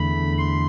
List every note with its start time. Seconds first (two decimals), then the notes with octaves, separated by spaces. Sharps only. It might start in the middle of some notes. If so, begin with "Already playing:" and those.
Already playing: E2 D3 A3 B5
0.38 C6